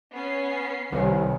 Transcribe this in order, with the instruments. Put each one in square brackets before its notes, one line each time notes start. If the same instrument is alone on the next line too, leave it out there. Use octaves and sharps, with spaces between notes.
[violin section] B3 C#4 C7
[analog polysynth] C2 [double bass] C3 D#3 [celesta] B4 C#5 G#5